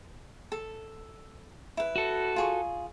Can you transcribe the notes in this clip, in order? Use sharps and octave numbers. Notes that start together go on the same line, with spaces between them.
A4
E4 B4
F#4 A4
F4 G#4 C#6